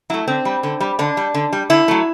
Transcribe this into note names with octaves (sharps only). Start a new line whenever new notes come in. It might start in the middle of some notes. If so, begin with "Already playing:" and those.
F#3 A3 E4
D3 C4
G3
D3
G3
D3 D4
G3
D3
G3
D3 E4
F#3 A3